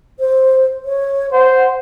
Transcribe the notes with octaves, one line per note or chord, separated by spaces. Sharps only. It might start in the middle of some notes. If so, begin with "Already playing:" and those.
C5
C#5
C5 F#5